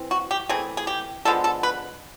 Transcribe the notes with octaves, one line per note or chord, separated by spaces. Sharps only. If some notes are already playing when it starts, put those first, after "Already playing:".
Already playing: E3 C4
F#4
G4
E3 A3 C4 G#4
G#4
G4
D3 F3 G#3 B3 A4
A4
B4